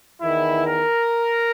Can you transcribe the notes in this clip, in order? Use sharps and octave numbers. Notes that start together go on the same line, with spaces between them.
E2 D#3 E4
A#4